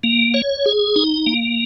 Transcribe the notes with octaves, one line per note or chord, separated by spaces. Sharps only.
A#3
C#5
G#4
D#4
A#3